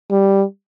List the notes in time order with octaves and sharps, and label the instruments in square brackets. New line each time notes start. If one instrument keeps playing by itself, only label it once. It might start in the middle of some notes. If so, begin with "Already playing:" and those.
[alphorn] G3